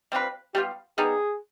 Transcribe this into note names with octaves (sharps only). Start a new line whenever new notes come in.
G3 C4 F4 B4
G3 B3 F4 G4
G3 B3 D#4 G#4